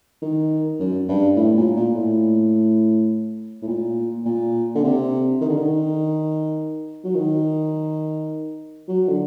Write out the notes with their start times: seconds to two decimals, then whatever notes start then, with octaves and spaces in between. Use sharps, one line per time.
0.22 D#3
0.80 F#2
1.09 G2
1.37 A2
1.57 A#2
1.76 A#2
1.95 A2
3.62 A2
3.68 A#2
4.25 A#2
4.75 D3
4.84 C3
5.41 D#3
5.49 D3
5.57 D#3
7.04 F#3
7.15 D#3
8.88 F#3
9.08 D3